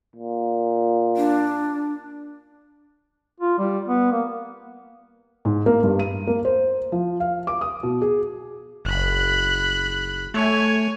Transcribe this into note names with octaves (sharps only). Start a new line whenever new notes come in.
A#2
D4
F4
G3
B3
A#3
G#2
A#3
G2
D#7
A#3
C5
F3
F5
D6
D#6
B2
G#4
F#1 B5 F#6
A3 C#5 G#5